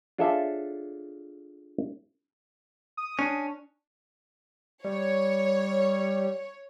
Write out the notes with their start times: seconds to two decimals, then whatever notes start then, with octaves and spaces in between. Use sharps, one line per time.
0.18 D4 F4 G#4 A4 C#5 E5
2.97 D#6
3.19 C#4 D4
4.85 G3 C#5